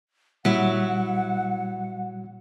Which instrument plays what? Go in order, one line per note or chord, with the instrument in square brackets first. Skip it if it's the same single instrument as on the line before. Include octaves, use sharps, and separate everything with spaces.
[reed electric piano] A#2 G3 [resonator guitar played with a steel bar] F#3 E4 [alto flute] F#5